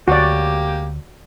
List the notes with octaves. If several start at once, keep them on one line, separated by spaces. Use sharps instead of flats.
D2 G#3 A#3 F#4 G4 D5